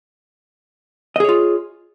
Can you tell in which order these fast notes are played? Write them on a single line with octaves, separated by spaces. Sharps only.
D#5 G#4 C#5 F4